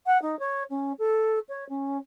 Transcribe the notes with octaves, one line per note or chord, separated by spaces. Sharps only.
F#5
D#4
C#5
C#4
A4
C#5
C#4